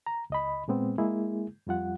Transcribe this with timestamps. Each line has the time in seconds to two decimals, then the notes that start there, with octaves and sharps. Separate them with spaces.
0.06 A#5
0.30 C#2 D#5 B5
0.68 A#2 G#3 B3 C4
0.98 G#3 A#3 E4 G#4
1.67 F2 G3 F4 F#5